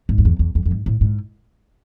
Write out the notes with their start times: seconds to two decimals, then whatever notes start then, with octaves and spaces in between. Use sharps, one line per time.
0.09 G#2
0.18 F2
0.25 E2
0.39 E2
0.55 F2
0.66 F2
0.71 G#2
0.86 A2
1.01 G#2